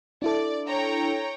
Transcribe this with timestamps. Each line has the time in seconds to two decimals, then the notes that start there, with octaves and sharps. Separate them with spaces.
0.22 D4 E4 A4 D5
0.67 C#5 G5 A#5